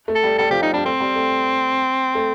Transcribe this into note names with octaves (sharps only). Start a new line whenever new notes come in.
A3
A4
G3
G3 A4
F3 G4
G3 D#4
G3 D4
A3 C4
G3
A3
A3